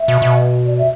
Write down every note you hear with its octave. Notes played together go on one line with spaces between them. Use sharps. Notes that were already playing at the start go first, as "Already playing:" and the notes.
Already playing: E5
B2
B2
D5
E5